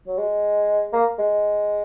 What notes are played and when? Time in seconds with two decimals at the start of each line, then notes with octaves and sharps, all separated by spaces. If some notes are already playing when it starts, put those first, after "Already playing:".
0.08 F#3
0.18 G#3
0.93 A#3
1.19 G#3